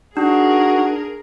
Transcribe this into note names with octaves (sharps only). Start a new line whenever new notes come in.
D4 D#4 F#4 G#4 A#4